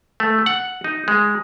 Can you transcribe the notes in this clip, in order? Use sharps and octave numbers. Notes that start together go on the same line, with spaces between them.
A3
F#5
D#4
G#3